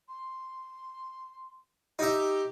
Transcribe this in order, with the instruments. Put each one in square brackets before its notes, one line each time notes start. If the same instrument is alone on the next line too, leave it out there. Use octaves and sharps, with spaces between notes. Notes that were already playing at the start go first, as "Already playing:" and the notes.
[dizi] C6
[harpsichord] D#4 E5 [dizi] G4